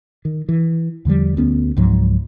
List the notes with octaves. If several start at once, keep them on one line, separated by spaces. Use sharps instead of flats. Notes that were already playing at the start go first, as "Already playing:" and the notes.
D#3
E3
E2 D3 F3 G3
D2 B3 C#4
C#2 G#2 F3 F#3